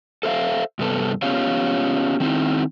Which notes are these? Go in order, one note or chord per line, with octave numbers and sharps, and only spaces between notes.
A4 C5 E5 F5
G2 C3 B3 A4
B3 C#4 F4 G4 C#5 F5
D#3 C4 D#4 E4